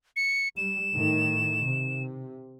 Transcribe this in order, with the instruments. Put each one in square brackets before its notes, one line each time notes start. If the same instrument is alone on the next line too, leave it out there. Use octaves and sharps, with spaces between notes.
[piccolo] C#7
[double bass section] G3 [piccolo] E7
[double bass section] A2 D#3
C3